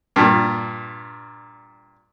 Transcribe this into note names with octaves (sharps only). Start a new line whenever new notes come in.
G2 A#2